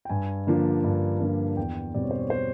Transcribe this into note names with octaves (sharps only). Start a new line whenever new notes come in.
G5
G2 G#5
D3 F3 A#3 D4
G2
D3 F3 A#3 D4
E2 G5
B2 G3 C4 D5
C#5
C5
C#5
C5